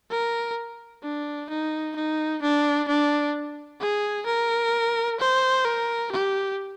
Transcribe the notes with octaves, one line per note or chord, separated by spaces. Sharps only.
A#4
D4
D#4
D#4
D4
D4
G#4
A#4
C5
A#4
G4